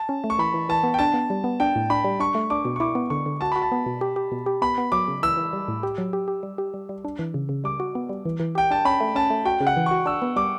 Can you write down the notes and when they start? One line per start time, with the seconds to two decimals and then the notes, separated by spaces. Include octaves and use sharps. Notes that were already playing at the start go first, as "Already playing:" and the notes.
Already playing: A5
0.09 C#4
0.24 A3
0.30 C#6
0.39 E3 B5
0.54 E3
0.69 E3 A5
0.83 B3
0.94 G5
0.99 D4 A5
1.14 B3
1.30 G3
1.44 B3
1.60 D4 G5
1.75 A2
1.90 D4 B5
2.04 G3
2.20 D4 C#6
2.35 A3
2.50 D4 D6
2.65 B2
2.76 C#6
2.80 E4 D6
2.95 B3
3.10 D3 C#6
3.26 D3
3.41 F#4 A5
3.52 F#4 B5
3.62 A5
3.72 B3
3.86 B2
4.01 G4
4.16 G4
4.32 B2
4.46 G4
4.62 B3 B5
4.78 B3
4.92 F#3 D6
5.08 C#3
5.23 E3 E6
5.37 E3
5.53 G3
5.68 A2
5.83 G4
5.98 F#3
6.13 G4
6.28 G4
6.43 G3
6.58 G4
6.74 G3
6.89 G3
7.05 D4
7.19 E3
7.34 C#3
7.49 C#3
7.64 G3 D6
7.80 F#4
7.95 B3
8.09 G3
8.26 E3
8.40 E3
8.55 G4 G5
8.71 D4 A5
8.85 C#4 B5
9.00 A3
9.16 C#4 A5
9.30 A3
9.45 F#4 G5
9.61 C#3
9.67 F#5
9.77 E3
9.86 F#4 C#6
10.06 D4 E6
10.22 B3
10.36 G3 D6